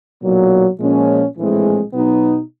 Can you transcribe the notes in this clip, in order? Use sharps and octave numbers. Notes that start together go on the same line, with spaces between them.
B1 A#2 F#3
A#2 F3 G#3 C#4
A#1 A2 E3 G#3 C4
B2 F#3 B3 D#4